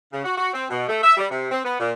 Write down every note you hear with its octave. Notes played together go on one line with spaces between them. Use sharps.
C#3
F#4
F#4
C4
B2
A3
E5
G3
C3
C4
B3
A#2